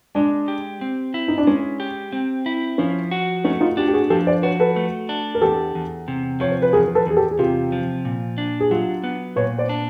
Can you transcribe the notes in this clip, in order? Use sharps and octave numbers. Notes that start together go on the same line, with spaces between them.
G#3 D4
G4
C4
E4
D#4
D4
G#3 C#4
G4
C4
E4
F3 C#4
F#4
A3 C#4 D#4
D#4 F4
D4 F4 G4
G4
F#4 G#4
F3 G4 A4
C5 D5
F#4 B4 C#5
A4 B4
A3
D4
A#4
E2 G4 A4
E2
C3
F3 C#5
C5
B4
E2 G#4 A#4
A4 B4
E2 G#4
G4 A4
G#4
C3 F4 G4
F3
A#2
D4
G#4
F#3 F4 G4
B3
A#2 B4 C#5
C5 D5
D4